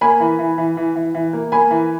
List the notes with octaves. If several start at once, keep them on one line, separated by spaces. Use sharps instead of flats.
A#3 G#5 B5
E3
E3
E3
E3
E3
E3
A#3
A#3 G#5 B5
E3